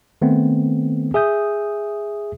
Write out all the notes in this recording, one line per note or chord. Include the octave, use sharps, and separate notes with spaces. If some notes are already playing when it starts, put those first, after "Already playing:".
D#3 A3 B3 C4
G#4 E5 D#6 G6